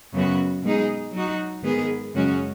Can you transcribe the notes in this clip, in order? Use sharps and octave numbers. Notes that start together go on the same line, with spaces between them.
F#2 C#3 B3 F#4
B2 G#3 D#4 G#4
F#3 D#4 F#4
G#2 D#3 G#3 B3 G#4
F#2 C#3 G#3 C#4 F#4